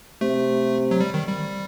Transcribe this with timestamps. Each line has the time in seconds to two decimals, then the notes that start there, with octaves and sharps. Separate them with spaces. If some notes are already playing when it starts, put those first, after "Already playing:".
0.21 C3 A3
0.91 F#3
1.00 G3
1.14 D#3
1.27 G3